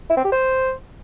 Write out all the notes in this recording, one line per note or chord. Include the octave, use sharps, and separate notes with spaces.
E4
C4
G4
C5